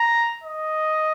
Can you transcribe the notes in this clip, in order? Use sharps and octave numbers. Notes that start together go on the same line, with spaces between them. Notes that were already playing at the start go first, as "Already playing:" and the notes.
Already playing: A#5
D#5